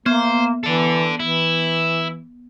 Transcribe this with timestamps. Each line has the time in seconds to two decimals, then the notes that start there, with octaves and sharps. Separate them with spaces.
0.06 A#3 B3 C5
0.64 E3 A4 D5
1.20 E3 E4